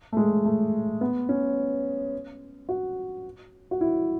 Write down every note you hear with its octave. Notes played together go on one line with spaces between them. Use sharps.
A3
G#3
A3
B3
C#4
F#4
F#4
E4